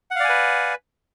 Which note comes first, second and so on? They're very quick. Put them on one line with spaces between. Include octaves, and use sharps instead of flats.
F#5 F5 D5 G#5 B4